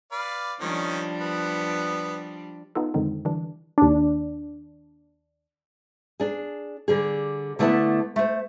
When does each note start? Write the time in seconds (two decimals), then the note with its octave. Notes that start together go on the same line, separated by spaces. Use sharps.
0.12 B4 D5 F5
0.60 D#3 F3 G3 C#4 D4
1.21 B3
2.75 B3 D#4 F4 A4
2.94 F2 D3 D#3 G#3 C4 D#4
3.25 D3 E3 G3 D4
3.78 D#2 D4
6.20 D4 G#4
6.88 D3 G3 G#4
7.59 D3 A3 B3 E4 A5
8.16 A3 C5